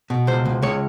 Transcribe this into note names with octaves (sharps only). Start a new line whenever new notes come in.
B2
C#2 C5
C#2
C#2 C#5